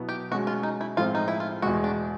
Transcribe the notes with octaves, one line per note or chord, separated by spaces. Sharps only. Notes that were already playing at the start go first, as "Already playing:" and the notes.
Already playing: B2 F#3 B3 E4
G4
B2 G#3 C#4 F#4
F4
D#4
E4
A2 F3 G#3 C4 F4
D#4
E4
F4
E2 B2 G#3 F#4
D4